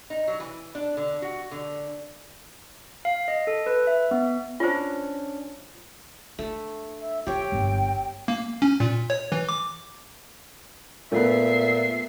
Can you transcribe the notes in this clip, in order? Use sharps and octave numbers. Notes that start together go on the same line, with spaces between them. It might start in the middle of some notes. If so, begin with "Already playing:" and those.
D#4
F#3
E3
D4
D3
F#4
D3
F5
D#5
A4
B4
E5
B3
C#4 D4 F4 C5
A3 D4
E5
E3 G4 C#5 G5
G1 F#2
A#3
C#4
A#2
C#5
E3
D6
A#2 A3 B3 E5 C7